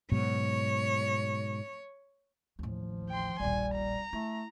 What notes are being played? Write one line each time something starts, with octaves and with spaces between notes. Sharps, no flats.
G#2 B2 F#3 C#5
A1 D#2 F3
G5 C6
D#1 A#1 G3 G#5
A#5
A3 E4